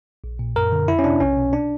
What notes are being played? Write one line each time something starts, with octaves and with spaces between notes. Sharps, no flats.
A#1
A#2
F#2 A#4
D3
F2 E4
C#4
C3 D4
B1 C#4
B2
D4